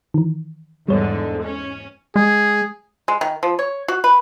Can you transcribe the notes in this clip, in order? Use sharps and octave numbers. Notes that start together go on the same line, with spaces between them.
D#3 E3
E2 G#2 D3 G3 C#5
C#4
G#3 G#4
G#3
D#3
F3
C#5
F#4
B4